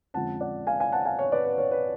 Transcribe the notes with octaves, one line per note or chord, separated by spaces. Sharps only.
F2 D3 F3 G#3 C#4 F#5 A5
D5 F#5
F5 G#5
F5 G#5
F#5 A5
F5 G#5
C#5
B4 D5
B4
C#5
B4